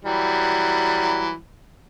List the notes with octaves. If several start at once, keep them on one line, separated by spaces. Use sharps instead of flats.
E3 F#3 G3